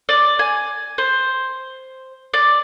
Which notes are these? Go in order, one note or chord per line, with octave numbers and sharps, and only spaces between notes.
D5
G#5
C5
D5